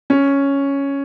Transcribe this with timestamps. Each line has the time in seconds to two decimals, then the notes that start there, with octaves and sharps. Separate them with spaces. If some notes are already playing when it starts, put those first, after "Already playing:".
0.10 C#4